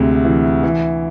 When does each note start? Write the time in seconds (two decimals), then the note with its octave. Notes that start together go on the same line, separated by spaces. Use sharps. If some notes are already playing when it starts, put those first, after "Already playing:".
Already playing: D2 C3 G#3
0.25 E3
0.63 E3